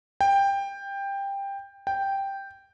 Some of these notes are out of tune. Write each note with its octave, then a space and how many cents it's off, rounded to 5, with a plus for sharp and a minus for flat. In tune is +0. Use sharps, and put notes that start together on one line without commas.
G5 +15
G5 +0